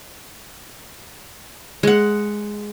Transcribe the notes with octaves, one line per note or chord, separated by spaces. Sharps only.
G#3 F#5